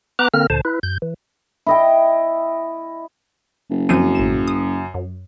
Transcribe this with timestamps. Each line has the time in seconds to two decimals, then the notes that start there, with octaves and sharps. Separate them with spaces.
0.19 B3 B4 A#5 D6 F#6
0.34 D3 A#3 C4 A#4 F6
0.50 D2 A#2 D3 C5 A5
0.65 E4 B4
0.83 F#2 G6
1.02 E3
1.67 E4 D#5 G5
3.70 F#1
3.89 F#2 F3 C4 D#7
4.15 A1 E7
4.47 D#6
4.94 F#2